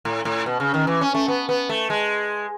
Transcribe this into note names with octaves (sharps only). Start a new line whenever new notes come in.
A2
A2
B2
C#3
D#3
E3
C#4
A3
B3
B3
A3
G#3